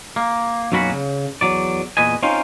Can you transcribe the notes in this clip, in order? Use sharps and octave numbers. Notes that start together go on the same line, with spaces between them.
A#3
B1 F#2 A#3 C#4 F#4 B5
C#3
E2 F#3 D5
E2 A#2 B4 D#5 G#5
C4 C#4 D#4 F4 A#4 C5